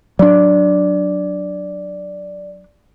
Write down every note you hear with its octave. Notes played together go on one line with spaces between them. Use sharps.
F#3 D4 D5